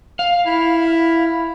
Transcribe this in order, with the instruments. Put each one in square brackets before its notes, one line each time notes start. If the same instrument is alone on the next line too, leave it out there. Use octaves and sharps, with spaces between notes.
[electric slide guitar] F5
[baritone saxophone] E4